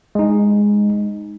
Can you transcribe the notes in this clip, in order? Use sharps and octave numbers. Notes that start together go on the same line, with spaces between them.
G#3 D#4